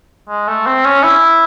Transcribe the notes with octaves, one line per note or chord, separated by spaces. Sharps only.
G#3
A3
C4
C#4
E4